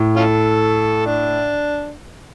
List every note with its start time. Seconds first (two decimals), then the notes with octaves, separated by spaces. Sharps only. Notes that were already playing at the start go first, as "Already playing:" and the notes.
Already playing: A2
0.16 C#4 F4 A4
1.07 D4